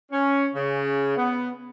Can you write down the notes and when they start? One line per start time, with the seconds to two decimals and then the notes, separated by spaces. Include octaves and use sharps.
0.12 C#4
0.55 C#3
1.17 B3